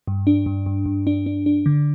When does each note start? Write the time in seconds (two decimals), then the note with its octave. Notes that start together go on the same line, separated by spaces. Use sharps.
0.08 G2
0.27 D4
0.46 G2
0.66 G2
0.86 G2
1.07 D4
1.26 D4
1.46 D4
1.66 D3